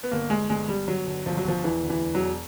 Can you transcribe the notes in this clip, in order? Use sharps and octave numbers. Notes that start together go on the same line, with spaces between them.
B3
G1 A#3
G1 G#3
G1 G#3
G1 G3
G1 F#3
G1
G1 F3
F#3
G1 F3
E1 E3
D2
E3
E1
F#3
E1